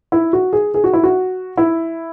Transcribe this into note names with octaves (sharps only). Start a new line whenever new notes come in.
E4
F#4
G#4
G#4
F#4
E4
F#4
E4